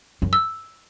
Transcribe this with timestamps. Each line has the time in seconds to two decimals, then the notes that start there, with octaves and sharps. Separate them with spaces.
0.22 F#2
0.33 E6